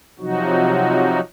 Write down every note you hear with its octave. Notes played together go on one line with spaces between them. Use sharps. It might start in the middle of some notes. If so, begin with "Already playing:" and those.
C3 F3 F#3 D#4 F#4